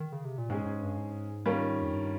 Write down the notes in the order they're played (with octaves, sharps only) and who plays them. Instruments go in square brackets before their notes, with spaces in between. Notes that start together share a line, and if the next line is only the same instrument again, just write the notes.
[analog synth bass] D#3
C#3
C3
A#2
[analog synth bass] G#2 [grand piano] G#3 C#4 G#4
[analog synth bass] G#2
G2
G#2
[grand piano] D#3 G3 C#4 F4 A#4
[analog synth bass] F2
G2